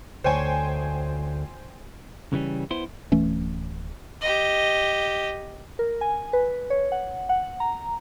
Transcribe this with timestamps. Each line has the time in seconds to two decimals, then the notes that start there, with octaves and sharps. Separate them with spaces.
0.24 D2 C5 C#5 G5 G#5
2.33 C#3 E3 G3 C#4
2.71 B3 E4 C5
3.12 D1 E3 A3 C#4
4.21 G4 D#5
5.79 A#4
6.01 G#5
6.33 B4
6.70 C#5
6.92 F#5
7.29 F#5
7.60 A#5